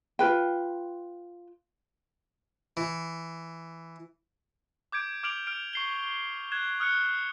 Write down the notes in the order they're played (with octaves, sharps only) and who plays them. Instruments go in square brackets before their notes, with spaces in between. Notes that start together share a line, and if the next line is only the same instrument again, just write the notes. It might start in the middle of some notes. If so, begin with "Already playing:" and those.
[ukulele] F4 G#4 B4 G5
[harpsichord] E3
[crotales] D6 G6 G#6 D7
D6 F6 D7 F7 F#7
F6 D7
C#6 C7 G7
F#6 G#6 E7
D#6 F6 F#6 C#7